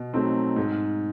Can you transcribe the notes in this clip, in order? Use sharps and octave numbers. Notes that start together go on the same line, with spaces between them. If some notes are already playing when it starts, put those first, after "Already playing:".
Already playing: B2
F#3 A3 C4 D#4
G#2